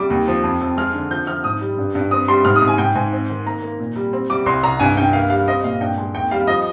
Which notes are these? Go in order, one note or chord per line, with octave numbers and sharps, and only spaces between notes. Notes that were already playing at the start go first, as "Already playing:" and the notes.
Already playing: G3 D6
D#2
F3
F2
F2
G#3 F6
D3
F3 G6
F3 F6
G#2 D#6
G3
G2
G2
C4 D#6
G3 C6
G#2 F6
D#6
G#2
G#5
G#2 G5
G#2 G#5
C4
D#3
A#3 A#5
A#3
A#2
G3
C4
G3 D6
C2 C6
C2 A#5
G2 G#5
G2 G5
A#3 F5
G3 F5
C4 D#5
A#2 F5
G2 G5
G#3
D#2 G5
G3 F5
F3 D#5